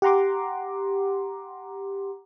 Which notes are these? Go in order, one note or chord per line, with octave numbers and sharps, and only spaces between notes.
G4 F#5 A#5 C6 D6